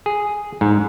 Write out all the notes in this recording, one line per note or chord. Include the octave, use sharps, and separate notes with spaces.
G#4
G#2